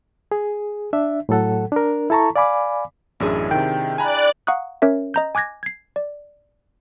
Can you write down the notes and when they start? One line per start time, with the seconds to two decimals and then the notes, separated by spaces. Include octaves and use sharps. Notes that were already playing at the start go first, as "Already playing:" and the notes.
0.32 G#4
0.93 D4 E5
1.29 A2 F#3 A4 F#5
1.72 D4 A#4
2.10 E4 A4 A5 A#5 C#6
2.36 D5 F5 G#5 B5 D6
3.20 A1 F#2 D4 E4 G#4
3.51 C3 D#3 G5
3.98 D5 G#5 A#5 B5 F#6
4.47 F5 F#5 A#5 C#6 D#6 F#6
4.82 C#4 A#4 C#5 E5
5.14 D#5 A#5 G6
5.35 G#5 D6 F#6 G#6 A#6
5.63 G#6 C7
5.96 D5